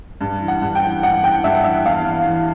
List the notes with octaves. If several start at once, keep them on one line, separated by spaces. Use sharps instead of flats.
G2
E3
F#5
G2
G5
E3
G2 F#5
E3 G5
G2 E5
E3 E5
E2 F5
E2
E3